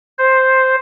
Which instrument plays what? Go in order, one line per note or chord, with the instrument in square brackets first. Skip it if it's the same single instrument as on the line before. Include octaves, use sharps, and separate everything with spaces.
[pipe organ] C5